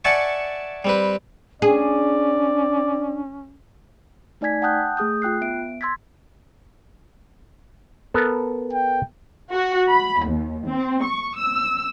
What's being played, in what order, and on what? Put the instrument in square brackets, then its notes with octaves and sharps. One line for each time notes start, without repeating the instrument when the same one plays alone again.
[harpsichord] D5 E5 F#5 G#5 A5 C#6
G3 C4 B4
[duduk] C#4 [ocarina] D4 [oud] G#4 [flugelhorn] D5
[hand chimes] A3 D#4 D5 G#5 G#6 B6
F#5 G5 A5 D#6 F#6 G6
A3 G#4 D#6 G6
F4 G5 F#6 C7
B3 E5 D7
C6 E6 G#6 A6 B6
[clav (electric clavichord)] B3 A4 A#4
[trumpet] G5
[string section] F#4
B5
D#2
C4
C#6
E6